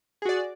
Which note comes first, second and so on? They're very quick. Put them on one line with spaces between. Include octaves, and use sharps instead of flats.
G#4 F#4 D5